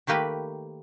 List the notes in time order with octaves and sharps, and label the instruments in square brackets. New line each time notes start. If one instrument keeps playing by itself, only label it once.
[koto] D#3 A3 A#3 G4 B4